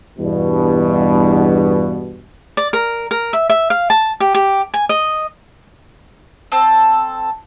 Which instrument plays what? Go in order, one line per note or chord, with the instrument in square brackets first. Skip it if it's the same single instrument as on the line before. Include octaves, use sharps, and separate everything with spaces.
[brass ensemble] E2 G2 B2
[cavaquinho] D5
A#4
A#4
E5
E5
F5
A5
G4
G4
G#5
D#5
[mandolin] C4 A4